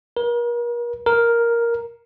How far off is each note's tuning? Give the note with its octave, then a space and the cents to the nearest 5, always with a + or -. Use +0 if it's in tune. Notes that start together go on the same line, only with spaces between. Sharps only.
A#4 +40
A#4 +5